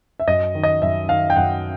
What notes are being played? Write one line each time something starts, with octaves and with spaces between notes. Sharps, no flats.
E5
F#2 D#5
D#3
D#5
F#2 E5
D#3 F5
G5
F#2 F#5